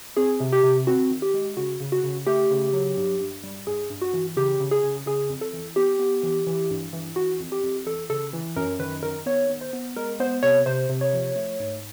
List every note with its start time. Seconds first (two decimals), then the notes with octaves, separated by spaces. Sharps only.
0.17 C4 G#4
0.40 C3
0.52 G4
0.64 C3
0.87 C4 F#4
1.10 D#3
1.22 G4
1.34 G#3
1.57 C#3 F#4
1.80 C#3
1.92 F#4
2.04 C#3
2.27 A3 G4
2.51 C#3
2.73 F#3
2.97 G2
3.20 G2
3.43 G3
3.67 G2 G#4
3.90 G2
4.02 F#4
4.14 E3
4.37 C#3 G4
4.60 C#3
4.71 G#4
4.83 C#3
5.06 C#3 G#4
5.30 F2
5.41 A4
5.53 E3
5.76 B3 G4
5.99 B3
6.23 E3
6.47 E3
6.70 G2
6.93 E3
7.16 E3 F#4
7.40 F2
7.52 G4
7.63 F2
7.87 E3 A4
8.10 C#3 A4
8.33 E3
8.56 F#2 A#4
8.80 D#3 B4
9.03 D#3 A#4
9.26 B3 C#5
9.49 B3
9.61 C5
9.73 B3
9.96 G#3 A#4
10.20 B3 C5
10.43 C3 C#5
10.66 C3 C5
10.89 C3
11.01 C#5
11.13 F3
11.36 A3
11.60 G#2